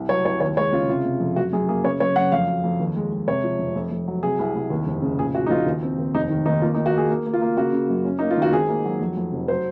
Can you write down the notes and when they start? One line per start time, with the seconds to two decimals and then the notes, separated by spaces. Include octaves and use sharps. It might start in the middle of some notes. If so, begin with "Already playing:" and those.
Already playing: C2
0.09 F#3 C#5
0.25 C2 C#5
0.40 D#2 C#5
0.57 G#3 C#5
0.72 C#3 F4
0.89 C3 F4
1.05 C3
1.20 F2
1.36 F#2 F#4
1.53 F#2 G#4
1.68 A#3 G#4
1.84 C#3 C#5
2.00 F#2 C#5
2.16 F#2 F#5
2.32 F2 F5
2.47 F#3
2.64 F2
2.80 D#2
2.96 G#3
3.12 G#3
3.27 C3 C#5
3.44 F3
3.59 F1
3.76 F2
3.91 F2
4.08 F#3
4.23 C3 G#4
4.39 C2
4.56 C2
4.70 D#2
4.87 F1
5.02 C#3
5.19 A#2 G#4
5.35 A#2 F#4
5.46 D#4
5.50 A#1 F4
5.66 D#2
5.83 C4
5.98 D#2
6.15 F1 D#4
6.30 D#3
6.46 D#2 D#4
6.62 A#3 F4
6.75 D#4
6.78 D#3
6.86 F#4
6.93 A#3 G#4
7.10 A#3
7.26 A#3
7.33 F4
7.41 A#3
7.57 C#3 F#4
7.73 C#3
7.90 F#2
8.05 C#4
8.19 A#3 D#4
8.31 F4
8.37 D#3 F#4
8.53 G#1 G#4
8.69 A#3
8.85 F#3
9.00 F2
9.17 F2
9.32 F1
9.48 F#3 C5